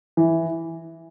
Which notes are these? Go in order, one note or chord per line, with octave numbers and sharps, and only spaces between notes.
E3